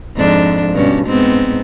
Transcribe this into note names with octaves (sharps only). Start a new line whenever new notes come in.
F2 G#2 D4
G2 B2 C#4
G#2 B3 C4